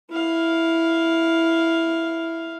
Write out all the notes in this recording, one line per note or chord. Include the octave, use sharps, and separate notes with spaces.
E4 F5